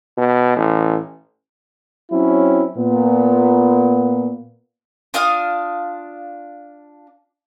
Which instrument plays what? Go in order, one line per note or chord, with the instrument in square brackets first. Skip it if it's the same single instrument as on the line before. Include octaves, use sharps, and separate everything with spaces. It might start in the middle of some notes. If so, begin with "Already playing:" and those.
[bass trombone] B2
A1
[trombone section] F#3 C4 C#4 E4
A#2 B3
[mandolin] D4 F4 F5 D#6